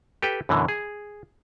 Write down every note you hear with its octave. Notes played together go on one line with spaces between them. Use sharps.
G4 A4 B4 G5
F#2 B2 D3 E3
G#4